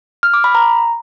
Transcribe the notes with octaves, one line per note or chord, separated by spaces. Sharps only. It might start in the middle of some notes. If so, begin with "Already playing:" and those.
F6
D6
B5
A#5